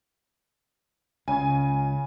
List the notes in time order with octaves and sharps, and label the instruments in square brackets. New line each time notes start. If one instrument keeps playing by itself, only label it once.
[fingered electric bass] C#2 [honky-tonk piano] C#3 G#5